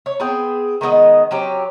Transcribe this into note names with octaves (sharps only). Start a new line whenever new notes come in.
C#5
B3 C4 G#4 G5
D#3 G#3 B3 D#5
F#3 C4 C#4 G4